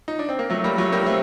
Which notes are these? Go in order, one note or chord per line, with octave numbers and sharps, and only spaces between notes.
D#4
D4
C4
A#3
F#3 A3
G3 A#3
F#3 A3
G3 A#3
A3 C4